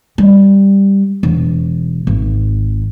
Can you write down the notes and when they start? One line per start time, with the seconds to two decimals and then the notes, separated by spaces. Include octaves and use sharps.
0.18 G3
1.23 E1
2.07 G#1